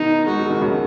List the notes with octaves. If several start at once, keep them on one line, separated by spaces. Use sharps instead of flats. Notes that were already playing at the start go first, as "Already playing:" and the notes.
Already playing: B2 D#3 D#4
G#3 F#4
F#3
D#3
C#3 F#3